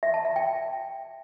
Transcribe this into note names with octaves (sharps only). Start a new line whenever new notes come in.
E5
A5
E5
G5